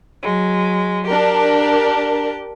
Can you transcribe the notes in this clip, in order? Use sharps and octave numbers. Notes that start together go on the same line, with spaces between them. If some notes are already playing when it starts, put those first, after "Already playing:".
F#3 G#3
D4 G4 A#4